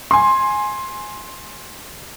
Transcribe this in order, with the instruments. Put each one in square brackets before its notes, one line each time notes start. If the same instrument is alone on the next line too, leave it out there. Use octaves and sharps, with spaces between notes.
[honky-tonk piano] G#5 C6